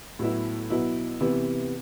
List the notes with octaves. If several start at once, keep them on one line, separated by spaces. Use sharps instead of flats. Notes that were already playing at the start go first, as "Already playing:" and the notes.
A2 F#3 B3 E4
B2 F#3 B3 E4
C3 E3 B3 E4